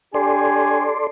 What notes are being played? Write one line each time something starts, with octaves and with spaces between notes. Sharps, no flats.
D4 G4 A4 C#5 D5 G#5 C6